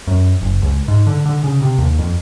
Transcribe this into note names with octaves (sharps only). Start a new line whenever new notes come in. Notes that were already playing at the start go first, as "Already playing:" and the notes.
F#2
F#1
C#2
G#2
D3
D3
C#3
C3
D#2
F2